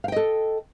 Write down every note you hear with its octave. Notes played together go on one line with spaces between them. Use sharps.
A4 D#5 F5 G5